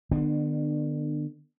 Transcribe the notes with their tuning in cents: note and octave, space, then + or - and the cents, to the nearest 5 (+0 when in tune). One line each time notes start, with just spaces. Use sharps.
D3 +45 B3 +0 D4 +30